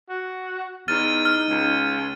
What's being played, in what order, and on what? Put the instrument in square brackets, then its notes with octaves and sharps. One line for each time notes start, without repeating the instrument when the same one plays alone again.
[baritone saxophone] F#4
[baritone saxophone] E2 [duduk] D#4 [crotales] F6 A6 D#7
[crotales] F6
[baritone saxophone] C#2